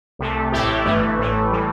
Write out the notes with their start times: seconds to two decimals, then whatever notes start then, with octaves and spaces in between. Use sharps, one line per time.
0.19 C2 C3 A3
0.52 A1 A2 A3 E4 G4
0.85 G1 G2 E3 A3
1.18 A1 A2 E3 A3
1.51 A2 E3 G3